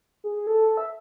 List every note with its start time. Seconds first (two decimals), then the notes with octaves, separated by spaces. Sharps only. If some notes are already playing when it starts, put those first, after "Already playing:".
0.24 G#4
0.36 G#4
0.47 A4
0.77 E5